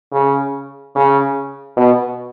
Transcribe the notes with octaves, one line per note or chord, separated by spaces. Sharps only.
C#3
C#3
B2